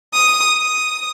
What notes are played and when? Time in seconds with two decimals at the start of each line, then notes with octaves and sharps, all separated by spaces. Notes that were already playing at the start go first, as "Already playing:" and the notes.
0.13 D#6
0.56 D#6